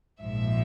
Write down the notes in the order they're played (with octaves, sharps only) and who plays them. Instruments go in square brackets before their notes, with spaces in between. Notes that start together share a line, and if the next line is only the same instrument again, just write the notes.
[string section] A#1 G#2 F3 E5